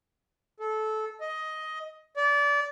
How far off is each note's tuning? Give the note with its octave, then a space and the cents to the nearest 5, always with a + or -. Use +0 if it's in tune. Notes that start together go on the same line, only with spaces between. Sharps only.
A4 -20
D#5 +10
D5 -25